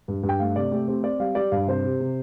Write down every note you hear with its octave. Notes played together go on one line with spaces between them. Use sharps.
G2
G2
G5
A3 F5
C3 D5
A3 G4
C4 G4
C4 D5
G3 F5
G3 D5
G2 F5
C3 C5
C3
C3